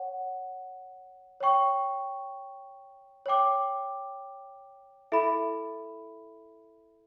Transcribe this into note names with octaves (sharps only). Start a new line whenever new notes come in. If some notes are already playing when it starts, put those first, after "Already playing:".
Already playing: C#5 F#5
C#5 G5 C#6
C#5 G5 D6
E4 A4 E5 B5